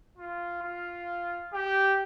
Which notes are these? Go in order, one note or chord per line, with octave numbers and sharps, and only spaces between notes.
F4
F4
G4